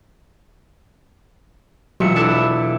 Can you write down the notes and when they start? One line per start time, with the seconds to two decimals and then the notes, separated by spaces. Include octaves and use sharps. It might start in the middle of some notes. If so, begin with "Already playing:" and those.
2.00 E1 F#3 F4 E5 C#7
2.16 D4 E4 A4